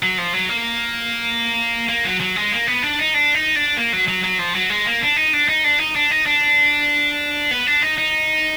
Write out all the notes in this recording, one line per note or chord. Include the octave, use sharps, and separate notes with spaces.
F#3
F3
F#3
A#3
A#3
F#3
F#3
G#3
A#3
B3
D4
D#4
D4
D#4
D4
A#3
F#3
F#3
F#3
F3
F#3
G#3
A#3
D4
D#4
D4
D#4
D4
D#4
D4
D#4
D4
B3
D4
D#4
D#4